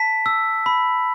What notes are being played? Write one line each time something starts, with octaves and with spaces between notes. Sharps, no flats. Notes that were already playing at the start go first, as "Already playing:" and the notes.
Already playing: A5 B6
E6
B5